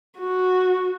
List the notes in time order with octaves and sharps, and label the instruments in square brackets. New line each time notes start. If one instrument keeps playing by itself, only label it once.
[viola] F#4